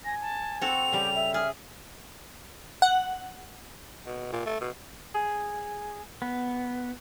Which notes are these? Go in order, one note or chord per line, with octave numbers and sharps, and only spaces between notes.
G#5 A#6
A5
C4 F#4 A4 F7
C#3 G3 G4
E5
G#4 F6
F#5
B2
A#2
A3
B2
G#4
B3